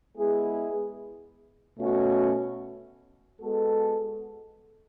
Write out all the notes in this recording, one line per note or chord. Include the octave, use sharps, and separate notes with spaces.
G#3 B3 E4 G#4
B2 A3 C#4 F#4
G#3 B3 F#4 A4